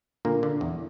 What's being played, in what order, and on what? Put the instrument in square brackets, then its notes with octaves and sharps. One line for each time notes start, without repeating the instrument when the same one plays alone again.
[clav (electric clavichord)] A#2 D3 A#3
D3
E2